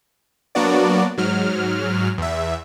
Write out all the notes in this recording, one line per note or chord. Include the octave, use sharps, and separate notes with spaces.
F#3 A#3 B3 D4 F#4 D5
G#2 F#3 F6
E2 E5